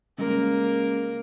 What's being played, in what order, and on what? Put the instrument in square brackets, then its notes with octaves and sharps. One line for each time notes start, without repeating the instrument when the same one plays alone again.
[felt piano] C#3 G#3 [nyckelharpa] A#3 A#4